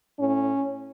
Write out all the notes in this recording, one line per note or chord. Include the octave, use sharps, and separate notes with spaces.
A2 C#4